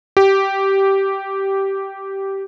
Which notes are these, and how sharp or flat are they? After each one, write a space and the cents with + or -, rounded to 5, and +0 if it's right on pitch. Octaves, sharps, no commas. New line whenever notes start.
G4 -10